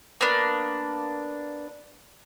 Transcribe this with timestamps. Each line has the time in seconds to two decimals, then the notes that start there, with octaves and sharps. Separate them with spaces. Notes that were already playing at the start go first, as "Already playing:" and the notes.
0.21 A#3 B3 D4